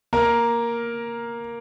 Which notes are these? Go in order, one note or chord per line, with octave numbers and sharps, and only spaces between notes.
A#3 A#4